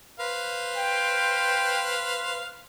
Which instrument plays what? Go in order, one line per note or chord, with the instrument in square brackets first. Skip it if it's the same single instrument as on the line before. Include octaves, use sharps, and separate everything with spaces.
[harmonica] B4 C5 F5
[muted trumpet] G5